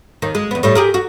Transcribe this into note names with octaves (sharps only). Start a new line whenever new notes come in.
D#2 D#3
G#3
E2 B3
A2 G3 A3
G4 G#4 A#4
F#4